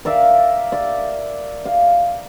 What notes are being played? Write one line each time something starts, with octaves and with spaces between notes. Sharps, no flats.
A#4 D5 E5 F5
D5
F5